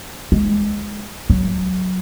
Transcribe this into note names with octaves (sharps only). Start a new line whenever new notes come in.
G#3
F#3